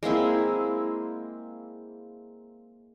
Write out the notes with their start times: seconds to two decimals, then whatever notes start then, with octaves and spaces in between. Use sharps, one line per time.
0.03 G#3 A#3 C4 E4